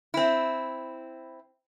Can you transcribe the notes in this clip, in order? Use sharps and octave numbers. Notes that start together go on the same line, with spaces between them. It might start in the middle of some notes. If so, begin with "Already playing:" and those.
C4 E4